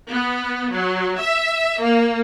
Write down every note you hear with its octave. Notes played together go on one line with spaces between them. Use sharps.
B3
F#3
E5
A#3